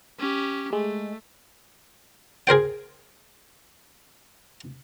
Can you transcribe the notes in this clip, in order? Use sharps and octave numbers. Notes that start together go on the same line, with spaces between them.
C#4 G4
G#3 A3
G#4 A#4 C5 G5